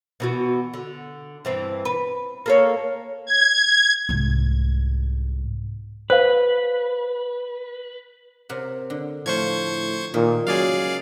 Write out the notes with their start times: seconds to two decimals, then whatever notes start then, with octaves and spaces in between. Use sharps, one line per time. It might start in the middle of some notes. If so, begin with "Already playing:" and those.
0.20 B2 E3 F#4
0.74 D3
1.45 G2 E3 C4
1.85 B4
2.46 A#3 A4 C#5
3.26 G#6
4.09 C2 G#2
6.10 B4 C5 F5
8.49 C3 A#4 F#5
8.90 D3
9.26 A2 F3 A3 C5 F#5 C#6 G#6
10.14 A#2 D#3
10.47 C#3 F#3 G#3 G#4 D5 F5